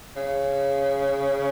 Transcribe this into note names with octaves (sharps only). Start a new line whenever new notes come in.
C#3